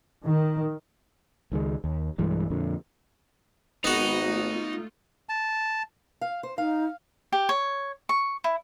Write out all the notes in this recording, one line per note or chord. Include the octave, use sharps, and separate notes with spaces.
D#3
C#2 D#3 G3 G#3
D#2
B1 G2 E3 G#3
F2 A#2 D3
G#1 F#3 G#3 B3 D#4 F#4 B4
A3 F4
A5
F5
C5
D#4 F5
G4
C#5
C#6
E4